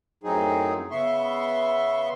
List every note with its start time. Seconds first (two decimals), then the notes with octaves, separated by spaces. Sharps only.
0.24 F#2 A2 F#3 C4 D#4 G#4
0.91 C#3 B3 E5 C6 C#6